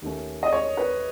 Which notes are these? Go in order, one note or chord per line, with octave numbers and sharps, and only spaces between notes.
D#2 D#3 A3 C#4
D#5
C#5
B4